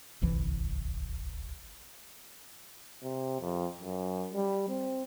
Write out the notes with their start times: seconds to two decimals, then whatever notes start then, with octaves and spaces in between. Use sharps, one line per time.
0.22 D1 G1 C2 E3
3.02 C3
3.41 F2
3.79 F#2
4.33 G3
4.68 C4